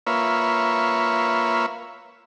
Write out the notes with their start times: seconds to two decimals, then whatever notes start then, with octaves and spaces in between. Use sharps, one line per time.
0.07 A#3 F4 B4 C#5 E5